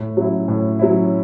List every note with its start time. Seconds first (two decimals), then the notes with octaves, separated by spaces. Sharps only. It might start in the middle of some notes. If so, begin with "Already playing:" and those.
Already playing: A2
0.17 F#3 C#4 E4
0.48 A2
0.79 F#3 C#4 E4